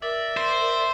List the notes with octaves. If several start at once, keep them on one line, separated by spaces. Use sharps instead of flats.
A#4 D5 E5
C5